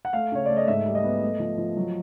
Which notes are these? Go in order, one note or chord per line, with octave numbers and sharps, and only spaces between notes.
F#5
A3 F5
C#3 C#5
A3 D5
D#5
G#2 E5
G3
D#5
B3
A3
F3
F3
F#3